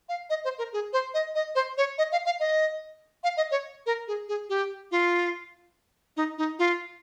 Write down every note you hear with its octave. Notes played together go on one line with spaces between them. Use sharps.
F5
D#5
C5
A#4
G#4
C5
D#5
D#5
C5
C#5
D#5
F5
F5
D#5
F5
D#5
C#5
A#4
G#4
G#4
G4
F4
D#4
D#4
F4